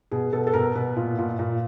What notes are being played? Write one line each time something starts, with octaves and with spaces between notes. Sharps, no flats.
B2 G#4
B2 A4
A4
B2 A#4
B2 B4
A#2
A#2
A#2